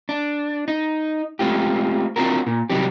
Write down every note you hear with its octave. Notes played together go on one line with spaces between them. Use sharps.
D4
D#4
G#3 A3 C4 F4 G4
C4 D4 F4 F#4 A#4
A#2
C3 D#3 F#3 G3 C4 G4